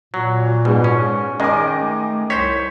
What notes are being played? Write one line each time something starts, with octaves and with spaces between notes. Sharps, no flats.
A#2 F#3
G#2 B2 G#3
C#4
D#3 G#3 C#4 D#5 G#5 D6
A3
C2 C5 C#5 B6